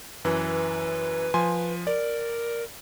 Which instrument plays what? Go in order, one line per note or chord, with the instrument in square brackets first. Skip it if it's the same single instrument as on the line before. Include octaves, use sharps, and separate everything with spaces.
[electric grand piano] F#2 E3 [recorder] B4
[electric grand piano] F3 G#5 C6
[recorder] A#4 [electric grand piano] D5